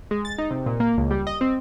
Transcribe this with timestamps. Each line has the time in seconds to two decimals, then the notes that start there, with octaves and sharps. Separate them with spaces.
0.11 G#3
0.25 A6
0.38 D#4
0.51 C3
0.66 A#2
0.80 A#3
0.97 C#2
1.11 G3
1.27 D#5
1.41 C4